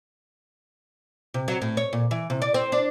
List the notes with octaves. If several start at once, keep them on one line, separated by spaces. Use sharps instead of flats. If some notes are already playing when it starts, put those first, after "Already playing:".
C3
F#3
A2
C#5
A#2
E3
C3
D5
C4
D4